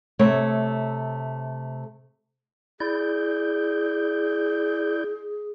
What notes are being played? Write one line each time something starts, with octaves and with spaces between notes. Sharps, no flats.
C3 A3 C#5
E4 G#4 D5 G6